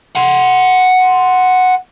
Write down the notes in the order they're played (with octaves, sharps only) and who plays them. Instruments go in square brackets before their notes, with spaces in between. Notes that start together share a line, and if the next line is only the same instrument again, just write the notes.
[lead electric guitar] F#5 C6